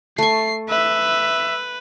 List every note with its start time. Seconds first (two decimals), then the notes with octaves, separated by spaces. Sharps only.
0.18 A3 C#6 C7
0.69 B4 E5